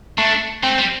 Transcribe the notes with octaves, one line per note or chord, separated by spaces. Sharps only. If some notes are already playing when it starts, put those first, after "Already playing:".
A3 D4
A3 C4
G3